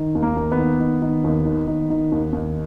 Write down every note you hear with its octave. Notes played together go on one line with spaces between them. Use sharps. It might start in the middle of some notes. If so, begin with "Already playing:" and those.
Already playing: D#3
D#2
A#3
D#2
B3
D#3
D#3
D#3
D#2
D#3
D#3
D#3
D#2
D#2